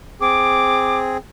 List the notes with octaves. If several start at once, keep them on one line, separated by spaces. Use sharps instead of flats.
C4 G#4 D6